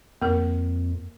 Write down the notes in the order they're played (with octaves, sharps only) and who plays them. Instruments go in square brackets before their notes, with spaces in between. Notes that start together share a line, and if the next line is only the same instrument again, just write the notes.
[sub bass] F2 [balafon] A#3 A#4